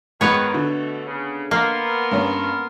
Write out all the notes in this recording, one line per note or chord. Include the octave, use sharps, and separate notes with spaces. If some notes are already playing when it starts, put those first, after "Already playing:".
G#2 D#3 B3 C#5 F#6 F7
B2 D3 A3
C#3
A#3 B3 A#4 C6
G2 C#4